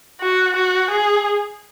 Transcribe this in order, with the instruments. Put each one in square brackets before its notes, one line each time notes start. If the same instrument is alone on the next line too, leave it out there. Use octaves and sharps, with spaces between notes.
[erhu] F#4
F#4
G#4